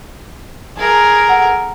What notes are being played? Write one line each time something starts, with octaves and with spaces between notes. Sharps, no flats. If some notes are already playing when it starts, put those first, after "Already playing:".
G#4 A#4 A5
A4 F#5